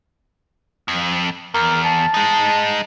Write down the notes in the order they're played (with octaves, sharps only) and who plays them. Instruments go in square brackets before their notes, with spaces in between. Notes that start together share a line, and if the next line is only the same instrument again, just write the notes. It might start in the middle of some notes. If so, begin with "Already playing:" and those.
[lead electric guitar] F2
[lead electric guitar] E2 [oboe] A#4
[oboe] A5
[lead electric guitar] G#3 D#4